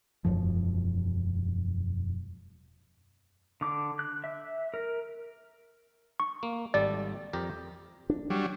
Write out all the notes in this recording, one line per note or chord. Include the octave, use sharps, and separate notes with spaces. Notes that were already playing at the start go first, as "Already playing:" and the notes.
E1 C#2 F#2 F3
D3 D6
F#6
E5
A#4
C#6
A#3
G#1 G3 A4 D5
F2 G4 A#4
D4
F#3 G3